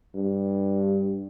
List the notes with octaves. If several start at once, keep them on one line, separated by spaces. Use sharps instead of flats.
G2